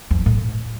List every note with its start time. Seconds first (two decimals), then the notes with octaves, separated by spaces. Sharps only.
0.11 F2
0.26 A2